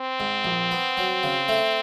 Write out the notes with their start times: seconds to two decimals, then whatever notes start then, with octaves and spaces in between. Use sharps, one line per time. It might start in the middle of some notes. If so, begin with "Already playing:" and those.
Already playing: C4
0.20 G#2
0.45 A#1
0.71 B3
0.97 F#3
1.23 C#3
1.48 A3